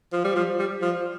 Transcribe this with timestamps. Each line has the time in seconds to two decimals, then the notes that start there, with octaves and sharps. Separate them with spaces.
0.13 F3
0.24 G3
0.35 F3
0.59 G3
0.82 F3